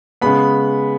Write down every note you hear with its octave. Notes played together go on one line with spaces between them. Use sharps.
C#3 G#3 B3 B5